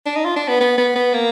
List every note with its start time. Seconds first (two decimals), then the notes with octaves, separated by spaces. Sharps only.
0.06 D4
0.16 D#4
0.25 F4
0.36 D4
0.48 B3
0.60 B3
0.78 B3
0.95 B3
1.13 A#3